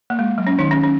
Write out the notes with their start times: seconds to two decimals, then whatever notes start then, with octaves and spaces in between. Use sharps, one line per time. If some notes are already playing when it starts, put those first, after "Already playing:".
0.10 A#3
0.19 G#3
0.38 F#3
0.47 C#4
0.59 D#3 D#4
0.71 C#4
0.83 C#4